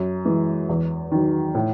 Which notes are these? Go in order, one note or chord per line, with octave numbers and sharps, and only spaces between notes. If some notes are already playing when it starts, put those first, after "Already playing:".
Already playing: F#2
E3 G#3
E2
D#3 F#3
A2